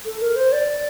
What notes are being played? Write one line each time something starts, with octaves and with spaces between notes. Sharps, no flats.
A4
A#4
C5
D5